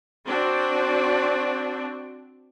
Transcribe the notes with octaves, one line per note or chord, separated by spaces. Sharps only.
C4 D4 F#4